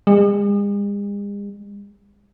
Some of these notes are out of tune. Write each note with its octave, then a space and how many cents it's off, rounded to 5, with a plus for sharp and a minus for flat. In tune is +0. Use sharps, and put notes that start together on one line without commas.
G#3 -45